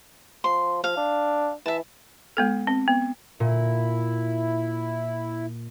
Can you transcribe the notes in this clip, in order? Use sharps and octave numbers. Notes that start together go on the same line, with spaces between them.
F3 C6
F3 F5
D4
E3 E5 A5
G#3 B3 A4
C4
B3
A#2 E4